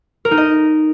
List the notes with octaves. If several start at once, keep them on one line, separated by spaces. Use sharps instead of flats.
A#4
D#4
D#5